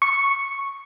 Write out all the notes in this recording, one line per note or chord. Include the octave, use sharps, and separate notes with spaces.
C#6